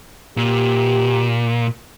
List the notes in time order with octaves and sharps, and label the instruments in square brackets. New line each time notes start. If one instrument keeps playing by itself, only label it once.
[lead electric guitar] A#2 [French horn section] G4